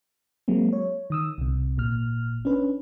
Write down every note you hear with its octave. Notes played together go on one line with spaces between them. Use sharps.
F#3 G#3 A#3 C4
C#5
D#3 D#6 E6
C2 C3
G#1 A#2 F6
C#4 D4 B4